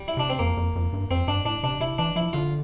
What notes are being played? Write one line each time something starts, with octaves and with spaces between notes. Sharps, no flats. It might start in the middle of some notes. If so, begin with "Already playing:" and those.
Already playing: G3
E4
C3 D4
C4
F2 A#3
F2
F2
G2
F2 C4
G2 D4
A2 D4
C3 D4
C3 E4
E3 D4
F3 E4
D3 F4